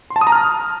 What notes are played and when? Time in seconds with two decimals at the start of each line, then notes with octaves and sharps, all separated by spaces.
0.10 C6
0.16 A5
0.21 D#6
0.27 A#5
0.32 F6